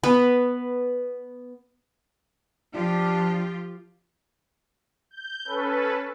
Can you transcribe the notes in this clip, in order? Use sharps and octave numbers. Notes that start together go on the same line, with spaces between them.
B3 B4
F3 D4 F4 G4
G6
C#4 A4 B4